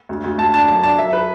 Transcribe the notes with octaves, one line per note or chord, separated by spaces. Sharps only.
D2
D2
D2 A5
D4 A5
F#2 A5
D4 A5
F#2 E5
B4